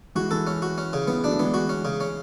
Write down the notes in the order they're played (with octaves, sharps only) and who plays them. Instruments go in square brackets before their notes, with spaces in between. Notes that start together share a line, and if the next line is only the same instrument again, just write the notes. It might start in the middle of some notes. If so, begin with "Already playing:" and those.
[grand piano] E3 G#3 [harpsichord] F#4
[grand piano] E3 [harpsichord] A4
[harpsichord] C#4
F#4
C#4
C#3
[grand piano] E3 [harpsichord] B3
[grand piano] D3 F#3 [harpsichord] D4
[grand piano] A3
[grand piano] E3 G#3 [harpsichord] B3
[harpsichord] F#4
C#4
C#3
C#4